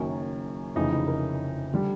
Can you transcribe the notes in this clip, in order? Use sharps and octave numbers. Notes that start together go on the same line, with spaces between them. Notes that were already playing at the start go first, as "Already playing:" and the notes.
Already playing: F#1 F#2 D#3 C#4
F1 F2 C#3 E3 D#4
E4
A#4
D3 G3